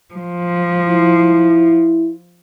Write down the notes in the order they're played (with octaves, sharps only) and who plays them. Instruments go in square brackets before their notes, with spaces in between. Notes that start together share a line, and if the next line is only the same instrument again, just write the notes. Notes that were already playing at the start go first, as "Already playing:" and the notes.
[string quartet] F3
[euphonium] E4